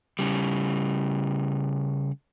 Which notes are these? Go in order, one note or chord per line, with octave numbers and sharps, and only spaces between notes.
C#3 G3